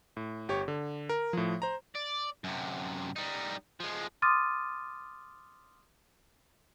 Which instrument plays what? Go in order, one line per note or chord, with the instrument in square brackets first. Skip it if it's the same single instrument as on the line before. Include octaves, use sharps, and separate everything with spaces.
[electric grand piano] A2
G1 G4 C#5 C#6
D3
A#4
A2 F3
C5 A#5
[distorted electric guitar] D5
F#2 C3
G3 D#4
F3 G#3
[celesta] C6 D6 D#6 F6 A6 D#7